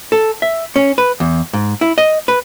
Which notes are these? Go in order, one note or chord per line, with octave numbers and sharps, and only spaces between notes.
A4
E5
C#4
B4
E2
G#2
E4
D#5
B4